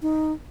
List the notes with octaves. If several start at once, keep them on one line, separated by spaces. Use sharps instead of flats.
D#4